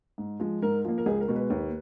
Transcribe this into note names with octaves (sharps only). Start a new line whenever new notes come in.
G#2
F3 G#3
G#2 A#4
F3 A#3
A#4
C#2 G#4
A#4
B2 G#3
B4
D#2